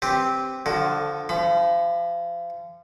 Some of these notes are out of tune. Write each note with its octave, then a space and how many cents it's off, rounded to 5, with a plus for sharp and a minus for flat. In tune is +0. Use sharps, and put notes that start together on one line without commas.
C4 +0 G4 +0 B4 +0
D3 +0 F3 +0 F#4 +30
F3 -30 B5 +25